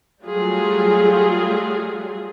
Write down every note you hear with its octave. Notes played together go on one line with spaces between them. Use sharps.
F#3 G3 A3 F4 G#4